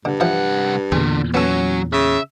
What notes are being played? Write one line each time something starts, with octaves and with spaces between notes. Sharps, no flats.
G2 D3
C2 E3 F3 F#5
E2 A#2 D3 G#4
F#3 B3 C#4 A4
C#3 E5